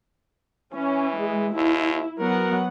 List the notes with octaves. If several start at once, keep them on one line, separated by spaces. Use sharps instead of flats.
E3 C#4
G#3
D#2 E4
F#3 B3 A#4 F#5